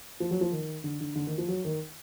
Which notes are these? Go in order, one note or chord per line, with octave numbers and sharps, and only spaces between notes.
F3
F#3
F3
D#3
D3
D3
D3
D#3
F3
F#3
D#3